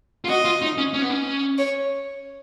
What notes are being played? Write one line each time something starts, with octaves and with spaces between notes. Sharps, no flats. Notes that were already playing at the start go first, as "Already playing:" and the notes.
F4
F#4 D#5
F4
D#4
C#4
C#4
B3
C#4
C#5